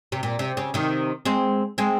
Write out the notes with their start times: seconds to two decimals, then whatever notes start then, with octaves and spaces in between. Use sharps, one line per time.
0.12 C3
0.23 A#2
0.39 C3
0.57 C#3
0.74 C3 D#3
1.25 G#3 C4
1.78 G#3 C4